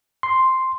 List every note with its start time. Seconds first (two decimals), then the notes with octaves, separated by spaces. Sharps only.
0.23 C6